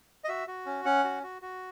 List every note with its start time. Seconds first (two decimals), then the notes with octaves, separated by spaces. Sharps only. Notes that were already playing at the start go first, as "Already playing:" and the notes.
0.24 D#5
0.28 F#4 E5
0.48 F#4
0.66 C#4
0.85 C#4 F#5
1.04 F#4
1.23 F#4
1.42 F#4